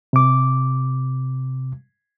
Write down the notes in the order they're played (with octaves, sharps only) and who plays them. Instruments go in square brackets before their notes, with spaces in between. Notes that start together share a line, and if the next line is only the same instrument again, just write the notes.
[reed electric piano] C3 D6